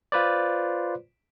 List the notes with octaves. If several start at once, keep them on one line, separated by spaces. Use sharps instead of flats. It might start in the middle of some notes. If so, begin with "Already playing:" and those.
F4 B4 C5 D5